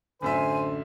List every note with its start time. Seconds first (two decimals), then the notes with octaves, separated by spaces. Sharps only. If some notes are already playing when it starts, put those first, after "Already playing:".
0.22 A1 F#2 D3 C5 E5 G#5